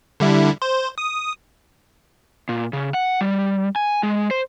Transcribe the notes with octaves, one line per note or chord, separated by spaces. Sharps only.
D3 G3 E4
C5
D#6
A#2
C#3
F#5
G3
G#5
G#3
C5